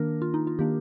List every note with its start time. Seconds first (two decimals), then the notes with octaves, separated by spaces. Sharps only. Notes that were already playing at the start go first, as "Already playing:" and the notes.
Already playing: D#3 A#3 D4 A#4
0.22 F4
0.34 D#4
0.47 F4
0.59 D#3 A#3 D4 G4